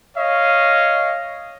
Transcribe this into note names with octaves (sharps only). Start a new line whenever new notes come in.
C#5 D#5 F5